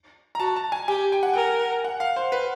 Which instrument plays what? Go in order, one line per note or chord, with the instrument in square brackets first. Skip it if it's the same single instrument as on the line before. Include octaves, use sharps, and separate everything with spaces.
[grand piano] A#5
[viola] F#4 [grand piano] A5
[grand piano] A5
G#5
[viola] G4 [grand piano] G#5
[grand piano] G5
F#5
[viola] A#4 [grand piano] G5
[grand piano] F#5
F5
C5
B4